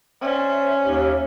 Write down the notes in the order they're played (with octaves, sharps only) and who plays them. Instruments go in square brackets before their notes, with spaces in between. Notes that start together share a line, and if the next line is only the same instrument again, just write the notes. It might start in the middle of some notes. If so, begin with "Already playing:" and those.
[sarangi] C#4 [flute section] C5 D5 E5
[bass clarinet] D#2 [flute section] D#4 G4 E5